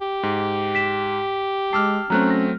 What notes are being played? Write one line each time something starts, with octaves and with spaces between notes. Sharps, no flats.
G4
G#2
B6 E7
G#3 A5 D6 E6 F6 C7
F#3 A3 C4 C#4 A#5 F#6
A#6